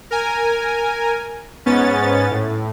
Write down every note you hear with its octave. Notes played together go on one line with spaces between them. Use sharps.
A#4 G#5
G#2 B3 C#4 A6
A2